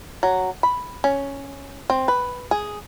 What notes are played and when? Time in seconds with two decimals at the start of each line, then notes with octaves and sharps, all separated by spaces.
0.23 F#3
0.63 B5
1.04 C#4
1.90 C4
2.08 B4
2.51 G#4